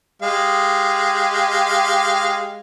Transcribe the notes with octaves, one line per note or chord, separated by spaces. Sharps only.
G#3 G4 F5